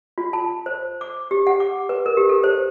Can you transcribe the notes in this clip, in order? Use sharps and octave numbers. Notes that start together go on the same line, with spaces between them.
F4
A5
C5
D6
G4
F#5
D6
B4
A#4
G4
A4
C5